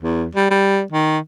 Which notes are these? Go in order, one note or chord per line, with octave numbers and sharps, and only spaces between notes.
E2
G3
G3
D#3